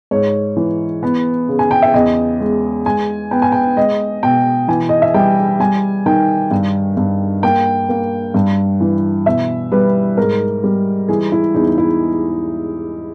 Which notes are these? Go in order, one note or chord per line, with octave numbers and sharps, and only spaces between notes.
G#2 C#5
E3
B3
C#3
G#5
G5
E5
E2 D#5
G#3
G#3 G#5
B3 G5
G#5
G5
G#3 D#5
B2 G5
E3 G#5
D#5
E5
G3 G5
G3 G#5
D#3 G5
G2
G2
A#3 G5
A#3
G2
E3
B2 E5
G3 B4
G#2 A#4
G3
E3 G#4
E4
E2 D#4
E4